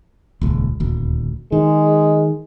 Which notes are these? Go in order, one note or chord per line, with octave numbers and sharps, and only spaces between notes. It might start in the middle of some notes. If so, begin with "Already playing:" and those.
D#1 C#2
D#1 D2
D#3 G#3